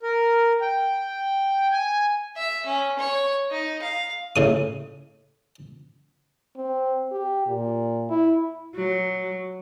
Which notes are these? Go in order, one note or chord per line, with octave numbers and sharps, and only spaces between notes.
A#4
G5
G#5
E5
C#4
C#5
D#4
F5
A2 C#3 D#6
C4
G4
A#2
E4
F#3